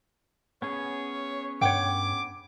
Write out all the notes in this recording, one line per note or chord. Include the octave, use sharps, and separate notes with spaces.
B3 C#4 G#4 C#5
G2 C#5 F#5 G5 D6